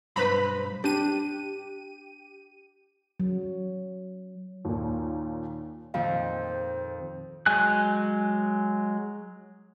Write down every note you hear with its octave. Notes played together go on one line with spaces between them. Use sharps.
B1 G2 B4 C5 A#5 B5
D4 G4 D#7
F#3
D#2 A#2
F2 A#2 D#3 C5 F5
F#3 G#3 G#5 F#6